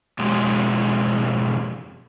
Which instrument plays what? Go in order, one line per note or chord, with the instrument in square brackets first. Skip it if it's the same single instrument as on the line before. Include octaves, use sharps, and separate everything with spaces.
[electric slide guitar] F2 B2 G#3 G4